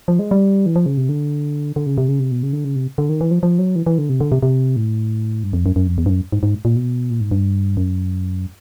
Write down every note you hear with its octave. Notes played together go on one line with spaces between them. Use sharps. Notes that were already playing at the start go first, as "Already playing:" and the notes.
F3
G#3
G3
E3
F3
C#3
C3
D3
D3
C#3
C3
C#3
C3
B2
C#3
D3
C#3
C3
D3
D#3
E3
F3
F3
F#3
E3
E3
D3
C3
D3
C3
C3
A2
G2
F2
F#2
F#2
F2
E2
G2
F#2
G#2
G#2
A#2
B2
A#2
G#2
G2
F#2